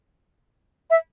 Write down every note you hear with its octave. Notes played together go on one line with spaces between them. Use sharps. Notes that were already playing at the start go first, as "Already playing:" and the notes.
E5